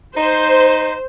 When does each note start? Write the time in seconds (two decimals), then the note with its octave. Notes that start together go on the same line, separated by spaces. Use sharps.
0.17 D#4 C5